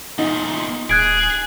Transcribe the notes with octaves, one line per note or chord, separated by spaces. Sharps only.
E2 A#2 D#4
D#1 G#4 F#6 G#6 D7